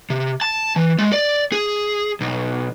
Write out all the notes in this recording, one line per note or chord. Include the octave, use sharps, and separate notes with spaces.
C3
A5
E3
G#3
D5
G#4
B1